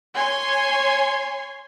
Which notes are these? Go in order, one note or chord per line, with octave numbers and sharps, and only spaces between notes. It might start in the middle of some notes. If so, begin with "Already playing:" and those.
C#5 G#5 C6